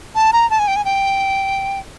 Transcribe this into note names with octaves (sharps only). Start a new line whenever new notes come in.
A5
A#5
A5
G#5
G5
G#5
G5